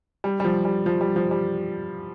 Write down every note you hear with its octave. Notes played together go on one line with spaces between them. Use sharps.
G3
G3
F3
G3
F3
G3
F3
G3